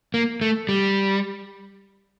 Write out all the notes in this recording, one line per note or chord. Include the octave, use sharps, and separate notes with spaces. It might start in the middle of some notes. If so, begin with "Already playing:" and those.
A#3
A3
G3